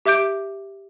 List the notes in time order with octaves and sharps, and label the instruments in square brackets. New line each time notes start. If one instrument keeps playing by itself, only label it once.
[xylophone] G4 E5 D6 G6 D7